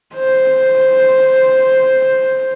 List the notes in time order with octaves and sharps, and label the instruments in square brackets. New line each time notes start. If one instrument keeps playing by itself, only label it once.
[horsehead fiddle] C5